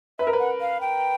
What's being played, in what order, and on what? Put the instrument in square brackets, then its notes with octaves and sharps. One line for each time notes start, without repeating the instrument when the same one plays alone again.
[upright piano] B4 [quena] E5
[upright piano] A#4
B4
[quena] F#5
F5
G5